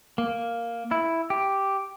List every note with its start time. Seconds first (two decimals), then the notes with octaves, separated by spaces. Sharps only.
0.18 A#3
0.91 E4
1.30 G4